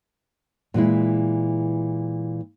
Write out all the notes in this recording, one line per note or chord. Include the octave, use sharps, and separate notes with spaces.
A#2 E3 G#3 E4